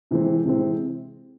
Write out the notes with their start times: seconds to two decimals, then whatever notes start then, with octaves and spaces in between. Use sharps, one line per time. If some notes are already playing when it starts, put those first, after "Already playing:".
0.11 C3 E3 G#3 C4
0.45 C3 E3 G#3 C4